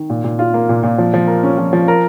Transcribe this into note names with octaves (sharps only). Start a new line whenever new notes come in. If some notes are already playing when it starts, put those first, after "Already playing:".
Already playing: D#3
A#2
A#2
F4
A#3
A#2
A#2
F3
F3
A#4
C#4
F3
F3
A#4